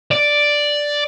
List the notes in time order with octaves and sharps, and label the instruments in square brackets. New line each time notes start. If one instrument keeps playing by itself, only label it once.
[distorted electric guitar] D5